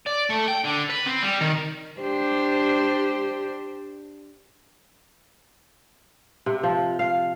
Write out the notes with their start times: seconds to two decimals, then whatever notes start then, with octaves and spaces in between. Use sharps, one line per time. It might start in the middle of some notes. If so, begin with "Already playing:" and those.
0.06 D5
0.30 A3
0.48 G5
0.65 D3
0.90 B4
1.07 C4
1.23 G3
1.41 D#3
2.00 D4 G4 C5
6.46 C3
6.63 F3
6.99 F5